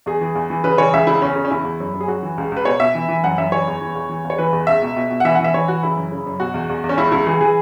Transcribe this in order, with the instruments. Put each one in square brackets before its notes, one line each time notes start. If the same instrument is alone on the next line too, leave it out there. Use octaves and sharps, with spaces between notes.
[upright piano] E2 G#4
E3
E2
E3
C#3 B4
E3 C#5
C#2 E5
C#3 E4
E2 C#4
C#3
C#4
E2 E4
E2
F#2
F#2
G#4
F#2 F#4
E3
C#2
C#2 B4
B2 C#5
B2 E5
E3
E3
F#2 F#5
F#2 E5
E3 C#5
E2
E3
E2
E3
E2
C#5
E3 B4
E2
C#2 E5
B2
B2
B2
F#5
E3 E5
F#5
E3
E5
E3 C#5
E3 F#4
C#3 E4
F#2
C#3
F#2
B2 F#4
E2
E2
E2
C#4
C#2 E4
C#2 E4
E3 G#4
E3 G#4